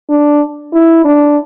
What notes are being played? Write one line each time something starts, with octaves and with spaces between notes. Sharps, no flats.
D4
E4
D4